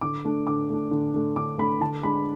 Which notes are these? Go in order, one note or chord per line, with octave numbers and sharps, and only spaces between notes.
D3 D6
A3 D4
D3 D6
A3 D4
D3
A3 D4
D3 D6
A3 D4 B5
D3 A5
G#3 D4 B5